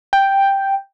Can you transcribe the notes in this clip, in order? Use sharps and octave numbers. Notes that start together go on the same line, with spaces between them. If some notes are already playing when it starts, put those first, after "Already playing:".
G5